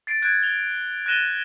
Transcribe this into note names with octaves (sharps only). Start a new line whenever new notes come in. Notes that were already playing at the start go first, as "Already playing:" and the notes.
A6 C7 D7
F#6 G#6 D7
F7 G7
F#6 A6 A#6 D#7 E7 G7